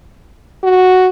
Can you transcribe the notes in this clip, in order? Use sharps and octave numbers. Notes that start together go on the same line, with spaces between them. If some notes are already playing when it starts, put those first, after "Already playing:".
F#4